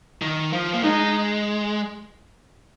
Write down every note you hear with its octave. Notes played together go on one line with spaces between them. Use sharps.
D#3
F3
A#3
G#3 D#4